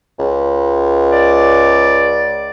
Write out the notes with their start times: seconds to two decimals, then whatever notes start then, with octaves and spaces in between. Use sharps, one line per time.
0.19 C#2
1.12 D5